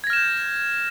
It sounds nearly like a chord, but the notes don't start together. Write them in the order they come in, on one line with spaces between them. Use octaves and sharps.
G#6 A#6 F6 E7 G6